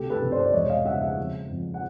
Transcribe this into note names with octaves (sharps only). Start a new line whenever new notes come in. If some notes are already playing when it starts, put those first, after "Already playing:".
Already playing: D2 C3 G4 A4
A4 B4
C3
C5 D5
D5
E1 C#5 D#5
D#5 F5
C#3 E5 F#5
E5 F#5
F2
F2
F#5